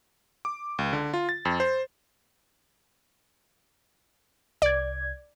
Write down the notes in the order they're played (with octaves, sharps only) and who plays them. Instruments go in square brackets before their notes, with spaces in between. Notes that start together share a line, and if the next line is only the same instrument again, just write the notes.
[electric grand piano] D6
C#2
D3
F4
A6
F2
C5
[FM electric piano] C2 G#6 [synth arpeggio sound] D5